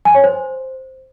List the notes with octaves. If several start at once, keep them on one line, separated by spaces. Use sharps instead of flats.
G#5
C#5
C5